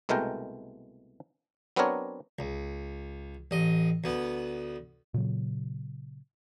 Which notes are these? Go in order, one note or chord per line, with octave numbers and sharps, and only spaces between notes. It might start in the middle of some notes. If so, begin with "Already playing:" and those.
C2 B2 G#3 A3 A#4 G5
F#3 B3 C4 D4 A#4 C#5
C#2
A1 D#5
D2 B3
A#2 C#3 F#3